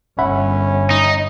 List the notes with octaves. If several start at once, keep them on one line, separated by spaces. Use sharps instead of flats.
G1 C#4 E5 F#5 B5
D#4